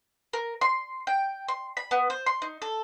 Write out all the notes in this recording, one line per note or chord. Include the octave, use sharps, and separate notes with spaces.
A#4
C6
G5
C6
B5
B3
C5
C6
D#4
A4